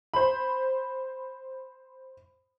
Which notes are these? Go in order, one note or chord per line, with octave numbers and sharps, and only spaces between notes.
C5 B5